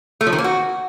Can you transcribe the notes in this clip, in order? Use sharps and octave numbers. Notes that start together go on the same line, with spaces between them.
A3
F3
D#3
A#3
F#4